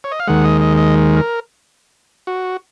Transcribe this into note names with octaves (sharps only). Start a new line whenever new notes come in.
C#5
D#5
F5
D#2 D#3 G#3 F#5
D#5
D#5
D#5
A#4
F#4